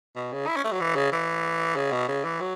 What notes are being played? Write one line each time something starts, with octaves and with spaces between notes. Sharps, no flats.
B2
C#3
E4
C#4
A3
F#3
E3
C#3
E3
C#3
B2
C#3
E3
F#3